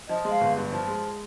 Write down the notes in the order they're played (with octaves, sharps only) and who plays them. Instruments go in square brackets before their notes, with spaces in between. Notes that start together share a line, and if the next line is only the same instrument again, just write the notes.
[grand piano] F3 [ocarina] D#5
[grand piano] G#3
[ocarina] F5
[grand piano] G1
G2
F3
G#3